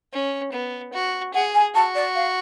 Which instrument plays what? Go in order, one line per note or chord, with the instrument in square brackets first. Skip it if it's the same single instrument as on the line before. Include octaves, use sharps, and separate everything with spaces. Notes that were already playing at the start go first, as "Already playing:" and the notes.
[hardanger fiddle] C#4
B3
F#4
[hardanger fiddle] G#4 [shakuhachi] F#5
[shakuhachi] G#5
[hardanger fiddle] F#4 [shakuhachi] A5
[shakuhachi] D5
F5